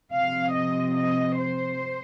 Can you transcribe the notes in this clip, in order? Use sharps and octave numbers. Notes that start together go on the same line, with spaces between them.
C3 F3 C4 F5
D#5
D#5
C5